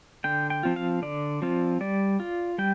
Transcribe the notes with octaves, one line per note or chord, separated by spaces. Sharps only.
D3 G5
G5
F3 C4 F4
F5
D3 D5
F3 C4 F4
G3 D5
F4
G3 G5